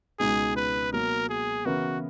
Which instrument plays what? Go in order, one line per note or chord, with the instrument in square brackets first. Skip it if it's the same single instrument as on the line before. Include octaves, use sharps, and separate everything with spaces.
[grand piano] C#2 B2 G#3 D#4 [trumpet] G#4
[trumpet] B4
[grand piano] B2 F#3 A#3 [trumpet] A#4
[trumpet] G#4
[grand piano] C#3 E3 B3 E4 A#4 [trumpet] F#4